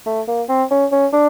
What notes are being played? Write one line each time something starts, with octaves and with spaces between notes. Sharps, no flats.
A3
A#3
C4
C#4
C#4
D4